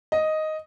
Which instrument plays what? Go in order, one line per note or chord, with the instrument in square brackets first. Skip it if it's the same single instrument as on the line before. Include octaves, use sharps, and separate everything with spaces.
[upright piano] D#5